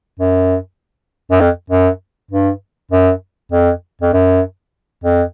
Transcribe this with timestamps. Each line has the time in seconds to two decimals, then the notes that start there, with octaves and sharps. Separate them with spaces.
0.20 F#2
1.32 F#2
1.41 F2
1.70 F#2
2.31 G2
2.92 F#2
3.52 F2
4.02 F2
4.13 F#2
5.04 F2